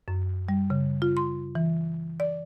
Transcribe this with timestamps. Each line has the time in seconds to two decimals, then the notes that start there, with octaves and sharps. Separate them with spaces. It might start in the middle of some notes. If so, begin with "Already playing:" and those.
0.08 F#2
0.49 G3
0.70 C#3
1.02 F4
1.17 C6
1.55 E3
2.20 D5